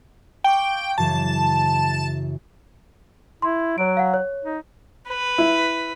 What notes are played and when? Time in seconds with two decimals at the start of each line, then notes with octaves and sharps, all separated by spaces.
0.44 F5 G5 C#6 D6
0.98 F#2 C#3 E3 A5
3.42 E4 C6
3.78 F#3 C#5 D7
3.97 F5 F#5
4.14 C#5
4.45 D#4
5.07 B4
5.38 E4